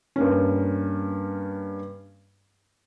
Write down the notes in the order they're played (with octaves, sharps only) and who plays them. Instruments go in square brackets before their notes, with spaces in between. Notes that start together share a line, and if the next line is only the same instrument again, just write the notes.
[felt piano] G2 A#3 C#4